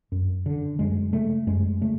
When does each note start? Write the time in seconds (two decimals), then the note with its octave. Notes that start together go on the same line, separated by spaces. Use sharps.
0.12 F#2
0.46 D3
0.79 F#2 G#3
1.13 C#3 A3
1.47 F#2 G#3
1.81 C#3 A3